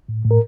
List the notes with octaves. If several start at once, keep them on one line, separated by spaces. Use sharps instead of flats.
A2
A2
A#4